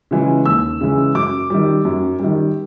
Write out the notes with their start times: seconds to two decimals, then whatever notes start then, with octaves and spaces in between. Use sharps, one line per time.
0.11 C#3 E3 G#3
0.46 D#2 E6
0.81 C#3 E3 G#3
1.15 F#2 D6
1.50 D#3 G3
1.85 F#2
2.20 D#3 G3